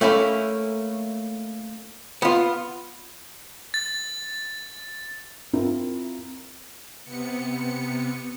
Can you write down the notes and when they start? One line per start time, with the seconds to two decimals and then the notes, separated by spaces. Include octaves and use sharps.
0.01 A3 A#3 C#4 E4
2.22 B3 F4
3.74 A6
5.53 C4 E4 F4 A#4
7.03 C3 B3 C#7